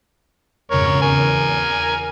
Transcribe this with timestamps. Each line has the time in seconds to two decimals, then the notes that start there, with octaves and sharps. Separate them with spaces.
0.71 F2 G#2 C#3 A#4 C#5
1.02 E2 A#4 G#5